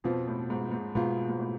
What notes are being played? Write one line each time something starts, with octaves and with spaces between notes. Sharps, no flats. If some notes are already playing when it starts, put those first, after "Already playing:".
F2 B2 F3 B3 F4
A2
G#2
G#2
G#2 B2 B3 F4
G#2
A2